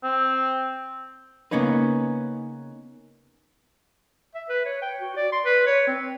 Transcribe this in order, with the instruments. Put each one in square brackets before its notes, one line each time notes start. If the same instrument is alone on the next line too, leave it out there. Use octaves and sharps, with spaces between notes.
[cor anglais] C4
[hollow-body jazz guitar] C#3 A#3 B3 C#4 D#4 B4
[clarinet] E5
B4
C#5
G5
F#4
D5
C6
B4
C#5
C4